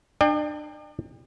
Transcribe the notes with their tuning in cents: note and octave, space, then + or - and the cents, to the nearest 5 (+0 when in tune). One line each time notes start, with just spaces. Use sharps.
D4 +35 D5 +45 G5 +35